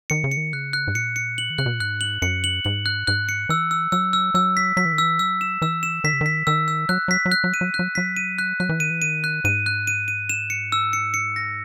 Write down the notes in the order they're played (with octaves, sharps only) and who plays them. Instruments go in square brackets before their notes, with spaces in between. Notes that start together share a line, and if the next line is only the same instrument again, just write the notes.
[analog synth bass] D#3 [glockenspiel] C#7
[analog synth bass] C#3
[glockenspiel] C#7
[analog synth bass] D#3
[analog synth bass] C#3 [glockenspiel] F#6
[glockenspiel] F#6
[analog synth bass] G#2
[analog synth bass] A#2 [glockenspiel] C#7
[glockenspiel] C#7
F#7
[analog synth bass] D#3
[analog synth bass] C#3 [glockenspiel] F#6
[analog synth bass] B2
A#2
[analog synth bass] G#2 [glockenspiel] F#6
[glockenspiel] F#7
[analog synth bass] F#2 [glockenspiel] C#7
[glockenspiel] F#7
[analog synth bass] G#2 [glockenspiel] F#7
[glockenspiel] F#6
[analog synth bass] G#2 [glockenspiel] F#6
[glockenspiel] C#7
[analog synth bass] E3 [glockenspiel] E6
[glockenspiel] E6
[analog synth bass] F#3 [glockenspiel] E6
[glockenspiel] E6
[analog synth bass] F#3 [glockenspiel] E6
[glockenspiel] B6
[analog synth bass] F#3 [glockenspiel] B6
[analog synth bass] E3
D#3
[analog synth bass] E3 [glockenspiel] E6
[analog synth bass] F#3 [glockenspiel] E6
[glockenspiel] E7
[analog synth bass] E3 [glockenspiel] E6
[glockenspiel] E7
[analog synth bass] D#3 [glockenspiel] B6
[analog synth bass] C#3
[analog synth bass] D#3 [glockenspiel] B6
[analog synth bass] D#3 [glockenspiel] E6
[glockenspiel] E6
[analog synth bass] F#3 [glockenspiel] F#6
[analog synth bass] F#3 [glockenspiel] B6
[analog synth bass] F#3
[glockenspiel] F#6
[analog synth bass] F#3
[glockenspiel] D#7
[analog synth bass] F#3
[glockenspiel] F#6
[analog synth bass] F#3
[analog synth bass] F#3 [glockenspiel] B6
[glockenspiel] D#7
F#6
[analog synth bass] F#3 [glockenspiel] F#6
[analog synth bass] E3
[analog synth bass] D#3 [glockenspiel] D#7
[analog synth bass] E3
[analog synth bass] D#3 [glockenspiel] D#7
[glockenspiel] F#6
[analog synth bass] G#2 [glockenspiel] D#7
[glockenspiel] F#6
D#7
D#7
E7
C#7
E6
C#7
C#7
A#6